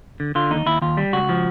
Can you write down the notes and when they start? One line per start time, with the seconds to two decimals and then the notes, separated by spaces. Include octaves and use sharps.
0.20 D3
0.35 D3 F4
0.51 D#2 D#4
0.66 D#2 E4
0.82 D#2 F4
0.97 G3
1.13 C#2 F#4
1.29 F3